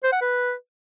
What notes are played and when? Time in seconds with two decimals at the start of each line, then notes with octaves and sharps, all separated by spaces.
0.03 C5
0.12 F#5
0.21 B4